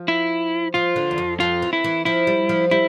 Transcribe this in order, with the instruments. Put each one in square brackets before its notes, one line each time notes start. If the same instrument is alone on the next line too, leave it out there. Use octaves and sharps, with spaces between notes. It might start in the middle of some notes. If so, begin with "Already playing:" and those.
Already playing: [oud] F3
[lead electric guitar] E4
[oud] F3 [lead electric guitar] F4
[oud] D3
E2
F2
[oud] F2 [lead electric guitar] F4
[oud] E3
[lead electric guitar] E4
[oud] E3
[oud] F3 [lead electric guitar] E4
[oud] G3
F3
[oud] G3 [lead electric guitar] E4